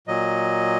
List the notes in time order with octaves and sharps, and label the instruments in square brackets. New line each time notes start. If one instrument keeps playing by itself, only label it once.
[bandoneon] A#2 F#3 D#5